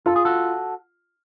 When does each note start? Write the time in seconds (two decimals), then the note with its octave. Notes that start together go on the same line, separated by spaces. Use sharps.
0.06 F4 A4
0.16 G#4
0.25 F#4 A4